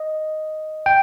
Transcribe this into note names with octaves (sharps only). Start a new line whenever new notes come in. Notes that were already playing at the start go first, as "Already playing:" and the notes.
Already playing: D#5
G5